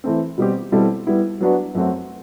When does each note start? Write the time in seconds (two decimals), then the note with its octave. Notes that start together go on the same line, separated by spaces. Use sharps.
0.04 E3 A3 C4
0.38 B2 G3 C4 G4
0.72 B2 G3 C4 E4 A4
1.07 G3 B3 E4
1.40 F#3 B3 D4 F#4 B4
1.75 F#2 F#3 A3 C4 F#4